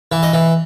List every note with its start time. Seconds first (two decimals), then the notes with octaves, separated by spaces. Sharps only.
0.12 E3
0.23 D#5
0.33 E3